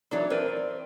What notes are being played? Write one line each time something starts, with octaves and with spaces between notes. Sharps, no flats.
E3 F#3 D4 D#4 C#5
C4 A#4 B4 D5